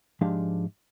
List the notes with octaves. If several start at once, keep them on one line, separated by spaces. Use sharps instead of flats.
G#2 F3 G#3 D4 G4 F5